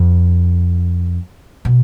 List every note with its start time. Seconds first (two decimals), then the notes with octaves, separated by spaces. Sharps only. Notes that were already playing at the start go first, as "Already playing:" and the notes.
Already playing: F2
1.65 B2